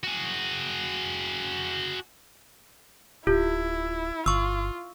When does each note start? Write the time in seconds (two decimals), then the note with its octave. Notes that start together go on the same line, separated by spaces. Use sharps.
0.03 F#4 G#4
3.27 D1 E4 F4 G4
4.26 G1 F4 C#6 E6